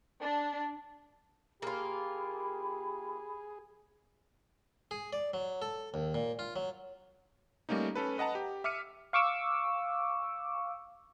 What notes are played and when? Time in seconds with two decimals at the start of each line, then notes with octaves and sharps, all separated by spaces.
0.20 D4
1.62 A#3 F4 G4 G#4 B5
4.91 G#4
5.13 D5
5.34 F#3
5.62 A4
5.94 D#2
6.14 A#2
6.39 F4
6.56 F#3
7.69 G3 A3 A#3 C#4 D#4
7.95 C#4 A4 B4
8.18 B4 D#5 F#5 A5 A#5
8.35 G4
8.64 E5 D6 F6 C#7 D#7
9.13 F5 C#6 D6 E6